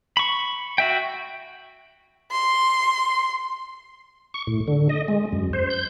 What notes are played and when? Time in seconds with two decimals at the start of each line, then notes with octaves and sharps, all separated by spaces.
0.17 B5 C#6
0.78 F#4 E5 G5
2.32 C6
4.34 C#6
4.47 A2
4.68 D3
4.89 D#5
5.08 G#3
5.32 F#2
5.53 C5
5.70 G6